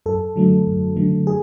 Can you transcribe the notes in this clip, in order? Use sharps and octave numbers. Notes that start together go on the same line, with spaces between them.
F#2 A4
D3 F#3 A3
F#2
D3 F#3 A3
G#4